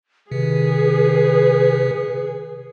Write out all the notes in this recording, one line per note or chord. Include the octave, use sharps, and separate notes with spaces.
C3 D#3 G#4 B4